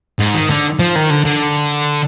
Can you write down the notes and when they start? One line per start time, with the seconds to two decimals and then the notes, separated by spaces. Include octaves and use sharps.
0.20 G#2
0.35 D#3
0.50 D3
0.80 F3
0.96 D#3
1.10 D3
1.25 D3